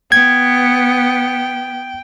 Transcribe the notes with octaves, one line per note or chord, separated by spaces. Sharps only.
B3 G5 G#6